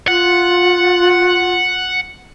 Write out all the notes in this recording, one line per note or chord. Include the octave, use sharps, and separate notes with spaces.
F4 F#5